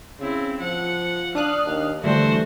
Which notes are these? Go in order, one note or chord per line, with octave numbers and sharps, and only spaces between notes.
C#3 C4 E4
F3 F#5
D4 F5 D#6 F#6
D#2
D3 E3 G3 A3 F#4 C5